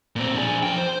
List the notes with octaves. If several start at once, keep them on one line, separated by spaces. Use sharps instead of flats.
A#2 C4
D4 G#4
F3 G5
C5